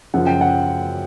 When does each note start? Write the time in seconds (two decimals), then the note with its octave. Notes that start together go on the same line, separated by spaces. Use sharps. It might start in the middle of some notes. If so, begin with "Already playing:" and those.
0.14 F#2 C#3 F3 F#5
0.26 G5
0.41 F#5